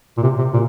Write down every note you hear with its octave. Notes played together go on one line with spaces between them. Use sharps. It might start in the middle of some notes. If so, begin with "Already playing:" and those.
A#2
C3
C3
A#2